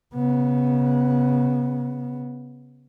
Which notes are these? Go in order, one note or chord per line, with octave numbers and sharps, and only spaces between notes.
C#3 B3